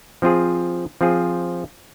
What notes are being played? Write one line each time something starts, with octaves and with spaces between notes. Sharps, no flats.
F3 C4 F4 G#4
F3 C4 F4 G#4